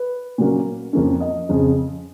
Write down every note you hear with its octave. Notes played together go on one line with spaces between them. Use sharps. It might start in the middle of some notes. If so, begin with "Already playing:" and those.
Already playing: B4
A#2 F#3 A#3 C#4
F2 F3 A#3 C#4
D#5
F2 C#3 F3